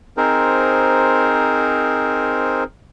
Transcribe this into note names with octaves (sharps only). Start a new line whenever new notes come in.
C4 D#4 G#4 A#4 C5